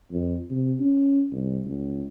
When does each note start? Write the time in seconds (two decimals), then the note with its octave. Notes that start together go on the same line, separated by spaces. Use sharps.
0.11 F2
0.50 C3
0.80 C#4
1.32 C2
1.65 C#2